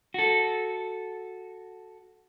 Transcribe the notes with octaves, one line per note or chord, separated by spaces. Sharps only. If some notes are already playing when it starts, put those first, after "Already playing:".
F#4 A4